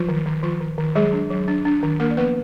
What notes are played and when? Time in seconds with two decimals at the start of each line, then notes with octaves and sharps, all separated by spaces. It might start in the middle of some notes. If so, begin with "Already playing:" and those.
Already playing: F3 F#3 F4
0.09 D#3
0.26 D#3
0.43 D#3 F3 F4
0.61 D#3
0.78 D#3
0.95 F#3 G#3 G#4
1.13 D4
1.30 F#3
1.48 D4
1.65 D4
1.83 D#3
2.00 A#3 D4 A#4
2.11 D5
2.17 F3 B3 B4